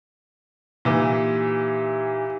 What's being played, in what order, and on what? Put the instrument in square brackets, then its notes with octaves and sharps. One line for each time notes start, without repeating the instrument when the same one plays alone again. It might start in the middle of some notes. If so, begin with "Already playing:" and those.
[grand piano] A#2 E3 [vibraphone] D#4 G4